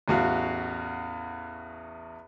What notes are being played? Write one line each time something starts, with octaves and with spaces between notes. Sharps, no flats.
A1 E2 F#4 F5